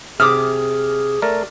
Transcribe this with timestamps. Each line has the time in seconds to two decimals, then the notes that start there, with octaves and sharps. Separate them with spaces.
0.20 C3 G#4 D6 D#6 F6
1.22 A3 A#4 D5